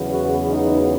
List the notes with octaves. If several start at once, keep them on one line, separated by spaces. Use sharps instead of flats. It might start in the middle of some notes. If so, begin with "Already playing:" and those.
Already playing: E2 C#3 F#3 B3
F#4
D#4